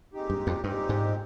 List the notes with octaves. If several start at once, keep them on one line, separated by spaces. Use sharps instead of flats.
A#2 G#3 C4 D#4 G4
G2
F2
G2 A#2 G#3 C4 D#4 G4
G#2